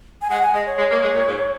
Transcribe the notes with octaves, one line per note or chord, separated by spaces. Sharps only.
G#5
G#3 F#5
G#5
G#3 D#5
C#5
G#3
A#3
G#3
A#2
G#2